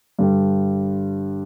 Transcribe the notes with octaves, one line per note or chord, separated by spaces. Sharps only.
G2 D3 G3